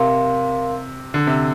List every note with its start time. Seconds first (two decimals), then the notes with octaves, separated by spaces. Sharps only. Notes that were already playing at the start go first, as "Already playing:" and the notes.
Already playing: C3 A#4 F5 C6
1.14 D3
1.27 C3